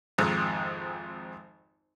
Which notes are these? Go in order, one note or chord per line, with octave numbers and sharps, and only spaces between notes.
G#1 F2 G#2